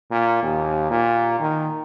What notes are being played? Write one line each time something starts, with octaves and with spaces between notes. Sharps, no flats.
A#2
D#2
A#2
D#3